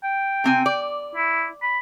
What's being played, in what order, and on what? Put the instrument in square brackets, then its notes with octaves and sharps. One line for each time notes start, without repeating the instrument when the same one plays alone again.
[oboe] G5
[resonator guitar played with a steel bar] C3 C4 G#5
D5
[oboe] E4
B5